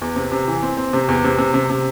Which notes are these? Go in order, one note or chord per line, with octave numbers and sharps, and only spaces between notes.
E2
C3
C3
E3
C4
C4
C3
E2
C3
C3
C3
C3